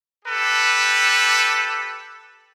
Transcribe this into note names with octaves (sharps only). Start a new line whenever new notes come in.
G4 A4 B4